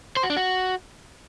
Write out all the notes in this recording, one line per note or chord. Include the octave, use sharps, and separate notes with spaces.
C5
F#4
D4
F#4